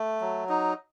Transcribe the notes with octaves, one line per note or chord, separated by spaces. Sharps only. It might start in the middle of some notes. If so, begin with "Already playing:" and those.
Already playing: A3
F#3
D#4